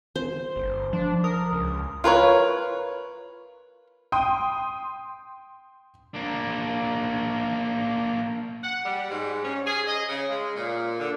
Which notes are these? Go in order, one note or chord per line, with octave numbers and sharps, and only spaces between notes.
C5
G1
F3 D4
A#4 D#6
C#2
F4 A#4 B4 C#5
G5 C6 D#6
A#3 D4
F#5
G3
G#2
C#4
G#4
D#5
C#3
G#3
A#2
D3